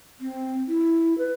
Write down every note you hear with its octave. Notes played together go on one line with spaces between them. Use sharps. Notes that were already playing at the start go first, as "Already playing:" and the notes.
C4
E4
B4